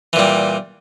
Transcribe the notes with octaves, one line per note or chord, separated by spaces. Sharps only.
A#2 E3 G3